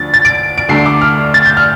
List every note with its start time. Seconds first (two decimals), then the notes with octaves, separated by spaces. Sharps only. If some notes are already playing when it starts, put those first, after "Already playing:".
Already playing: D2 D3 F3 A6
0.14 A6
0.25 D7
0.58 D7
0.69 D2 D3 A3 C7
0.86 D6
1.01 F6
1.34 A6
1.46 G6
1.57 F6